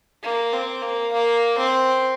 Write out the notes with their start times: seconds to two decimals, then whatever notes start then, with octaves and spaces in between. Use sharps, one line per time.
0.23 A#3
0.53 C4
0.82 A#3
1.13 A#3
1.58 C4